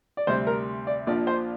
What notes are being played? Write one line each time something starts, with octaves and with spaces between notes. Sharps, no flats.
D5
D2 C3 G3 C4 C5
A#4
D5
A#1 A#2 F3 D4 F4 D5
C5